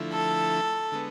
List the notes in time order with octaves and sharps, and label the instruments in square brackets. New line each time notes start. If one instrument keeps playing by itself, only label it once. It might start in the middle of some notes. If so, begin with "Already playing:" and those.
Already playing: [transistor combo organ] D3 F3 A3 E4
[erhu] A4
[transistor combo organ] D3 G#3 B3